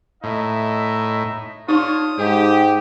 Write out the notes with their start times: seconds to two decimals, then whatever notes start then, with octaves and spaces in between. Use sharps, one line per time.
0.24 A2 D#4 D#5 E5
1.69 D4 D#4 F4 C#5 D#6
2.19 G#2 G4